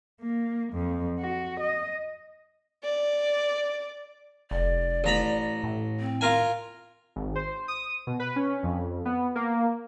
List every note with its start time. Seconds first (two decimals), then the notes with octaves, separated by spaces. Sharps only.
0.22 A#3
0.74 F2
1.19 F#4
1.60 D#5
2.84 D5
4.51 F1 D5
5.04 A1 A#5 B5
5.64 A2
6.00 C4
6.21 F4 A#4 G#5
7.16 G#1
7.35 C5
7.68 D#6
8.07 B2
8.20 B4
8.36 C#4
8.63 F2
9.05 B3
9.35 A#3